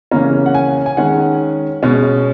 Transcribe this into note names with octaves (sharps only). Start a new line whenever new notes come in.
C#3 E3 A#3 C#4 A#5
F#5
G#5
G#5
D#3 G#3 C#4 F#5
B2 G#3 C#4